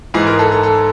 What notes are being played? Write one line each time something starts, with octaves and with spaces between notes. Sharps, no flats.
G#2 E3 G#3 G#4
A#4
A4
A4
A4